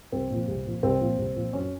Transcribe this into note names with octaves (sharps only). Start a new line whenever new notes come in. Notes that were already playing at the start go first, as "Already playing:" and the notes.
C2 C4
A#2 F3
C2
A#2 F3
C2 C4
A#2 F3
C2
A#2 F3
F#2 C#4